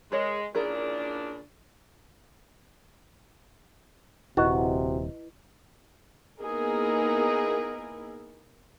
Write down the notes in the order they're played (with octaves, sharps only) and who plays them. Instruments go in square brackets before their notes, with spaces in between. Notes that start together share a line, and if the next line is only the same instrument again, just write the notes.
[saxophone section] G#3 [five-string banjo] G#4 A#4 C#5
[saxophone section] A#2 C#3 D4 [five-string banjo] E4 G#4 A#4
[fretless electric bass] D#1 [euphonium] C3 [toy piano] E4 B4 D#5 [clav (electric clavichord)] F#4
[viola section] A#3 B3 D#4 E4 G#4 A#4